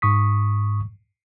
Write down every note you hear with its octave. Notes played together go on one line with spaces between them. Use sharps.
G#2 C#6 D#6 B6